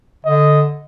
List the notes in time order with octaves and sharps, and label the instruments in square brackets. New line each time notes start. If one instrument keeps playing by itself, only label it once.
[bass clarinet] D3 [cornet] D#5